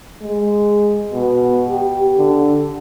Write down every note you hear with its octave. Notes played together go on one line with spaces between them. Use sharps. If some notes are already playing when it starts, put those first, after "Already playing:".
G#3
B2
G4
D3